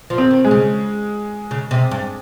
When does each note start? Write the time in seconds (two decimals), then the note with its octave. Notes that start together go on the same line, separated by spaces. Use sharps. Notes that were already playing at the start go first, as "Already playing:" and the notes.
0.10 F3
0.18 C4
0.31 D#3
0.45 G#3
0.51 C#3
1.51 C#3
1.71 C3
1.91 G2